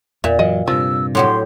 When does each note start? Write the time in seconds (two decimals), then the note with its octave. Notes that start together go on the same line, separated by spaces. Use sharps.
0.24 E2 A#2 E5
0.39 F#2 E3 F#3 D#5
0.68 G2 C3 F3 E6
1.15 A2 F#3 G4 C6